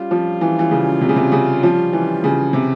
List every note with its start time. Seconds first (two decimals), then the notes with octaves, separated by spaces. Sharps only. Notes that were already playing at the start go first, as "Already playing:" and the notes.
Already playing: G3 C#4 F4
0.11 F3
0.41 E3
0.59 E3
0.71 C#3
1.01 C3
1.09 C#3
1.16 C3
1.32 C#3
1.63 F3
1.93 E3
2.24 C#3
2.53 C3